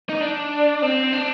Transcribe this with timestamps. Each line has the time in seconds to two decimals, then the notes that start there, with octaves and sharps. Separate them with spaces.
0.09 D#4
0.21 D4
0.82 C4
1.13 D4